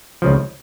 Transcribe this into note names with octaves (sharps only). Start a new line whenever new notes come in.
C#2 C#3 F3